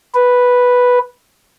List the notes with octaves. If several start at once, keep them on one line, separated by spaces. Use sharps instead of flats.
B4